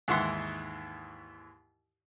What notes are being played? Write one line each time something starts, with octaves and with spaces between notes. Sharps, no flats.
D#2 G#2 E3 E4 F#5 C6